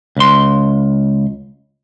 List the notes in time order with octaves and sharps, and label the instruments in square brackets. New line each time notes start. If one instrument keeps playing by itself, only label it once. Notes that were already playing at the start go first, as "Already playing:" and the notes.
[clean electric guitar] C#2 C6